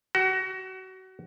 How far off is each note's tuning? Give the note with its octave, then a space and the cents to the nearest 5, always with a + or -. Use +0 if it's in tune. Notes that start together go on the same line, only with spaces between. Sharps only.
F#4 +30